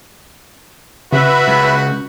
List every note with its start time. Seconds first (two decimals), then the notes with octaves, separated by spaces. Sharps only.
1.12 C#3 F#4 B4 E5 B5
1.48 C#2